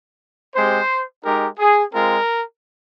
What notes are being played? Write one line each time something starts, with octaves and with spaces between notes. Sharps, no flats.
G#3 C4 G4 C5
G#3 D#4 G4 A#4
G#4
G#3 C4 F4 A#4